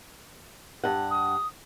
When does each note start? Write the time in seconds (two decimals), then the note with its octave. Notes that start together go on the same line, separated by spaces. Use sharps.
0.84 G2 F#5
1.11 D#6